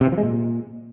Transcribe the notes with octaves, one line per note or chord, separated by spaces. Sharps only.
C3
E3
F3
G#3
A#2